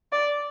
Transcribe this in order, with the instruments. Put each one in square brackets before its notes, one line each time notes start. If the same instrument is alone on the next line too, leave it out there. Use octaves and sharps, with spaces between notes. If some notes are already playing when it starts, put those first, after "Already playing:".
[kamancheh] D5